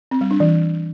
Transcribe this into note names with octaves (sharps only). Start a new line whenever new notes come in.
C4
G3
D4
E3